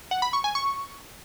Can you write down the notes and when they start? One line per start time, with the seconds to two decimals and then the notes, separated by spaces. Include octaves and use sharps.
0.11 F#5
0.22 B5
0.33 C#6
0.44 G#5
0.55 C#6